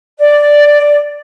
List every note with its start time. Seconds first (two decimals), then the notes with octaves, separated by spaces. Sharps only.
0.19 D5